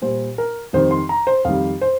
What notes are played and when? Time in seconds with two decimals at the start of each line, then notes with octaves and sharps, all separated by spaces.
0.02 A#2 G3 C5
0.38 A#4
0.73 F2 D#3 G3 C5
0.91 C6
1.09 A#5
1.27 C5
1.45 F2 D#3 G3 F5
1.81 C5